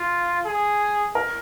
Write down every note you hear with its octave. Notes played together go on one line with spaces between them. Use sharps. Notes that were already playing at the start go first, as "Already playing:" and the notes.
Already playing: F4
G#4
A#4